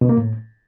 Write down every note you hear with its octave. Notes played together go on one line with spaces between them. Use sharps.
B2
A#3
A2